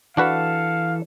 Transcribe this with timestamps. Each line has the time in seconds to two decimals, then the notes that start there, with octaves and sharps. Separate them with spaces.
0.17 E3 D4 F#4 A4 B4 F5